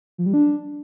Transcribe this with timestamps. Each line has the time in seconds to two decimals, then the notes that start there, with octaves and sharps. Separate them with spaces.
0.18 F3
0.26 G3
0.33 D4